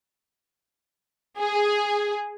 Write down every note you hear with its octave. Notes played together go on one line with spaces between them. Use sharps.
G#4